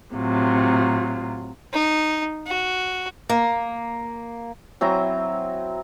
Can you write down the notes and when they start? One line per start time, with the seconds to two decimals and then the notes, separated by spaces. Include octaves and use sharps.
0.13 A2 C3 F#3 F4
1.73 D#4
2.47 F#4
3.29 A#3
4.81 F#3 C4 E4 A#5